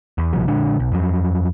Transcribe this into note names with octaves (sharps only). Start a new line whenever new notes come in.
E2
A#1 C3 F3 G3
A#2 D3 G#3 D4
B1
F2 F#3